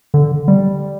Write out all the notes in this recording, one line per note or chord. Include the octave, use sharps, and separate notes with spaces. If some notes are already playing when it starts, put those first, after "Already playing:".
D3
G3